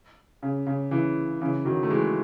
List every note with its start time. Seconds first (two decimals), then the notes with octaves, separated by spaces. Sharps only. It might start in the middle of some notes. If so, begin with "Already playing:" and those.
0.43 C#3
0.67 C#3
0.91 C#3 E3
1.41 C#3 E3
1.65 D#3 F#3
1.83 A3
1.90 E3 G#3